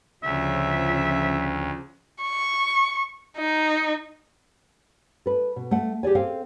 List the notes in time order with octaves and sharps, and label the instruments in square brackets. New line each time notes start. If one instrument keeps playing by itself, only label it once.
[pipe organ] D2 [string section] C#3 F3 [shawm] E5
[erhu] C#6
D#4
[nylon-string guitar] A4 B4
B2
A3 F#5
G4 G#4 D5 G#5
C4 A4 C5 F5 G5 G#5